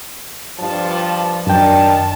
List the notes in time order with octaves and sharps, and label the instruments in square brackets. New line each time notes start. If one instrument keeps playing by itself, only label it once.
[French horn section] G2 F3 [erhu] A5
[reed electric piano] F#2 G5 [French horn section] D#3 D4 [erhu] A5